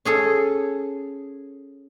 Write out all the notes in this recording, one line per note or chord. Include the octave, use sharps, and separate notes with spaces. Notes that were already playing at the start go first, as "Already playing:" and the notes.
C#4 G#4 A4